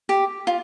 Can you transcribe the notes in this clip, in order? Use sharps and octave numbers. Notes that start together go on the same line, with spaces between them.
G4
F4